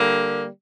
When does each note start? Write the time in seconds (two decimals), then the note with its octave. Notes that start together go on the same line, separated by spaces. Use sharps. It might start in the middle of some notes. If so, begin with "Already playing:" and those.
Already playing: D3 G3 A#3